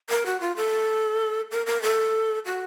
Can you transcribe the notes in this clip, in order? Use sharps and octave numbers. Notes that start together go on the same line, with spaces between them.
A#4
F#4
F4
A4
A#4
A#4
A4
F#4